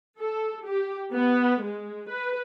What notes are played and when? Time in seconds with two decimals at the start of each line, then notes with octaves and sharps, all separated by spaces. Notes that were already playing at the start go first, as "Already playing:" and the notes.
0.19 A4
0.66 G4
1.13 B3
1.62 G#3
2.10 B4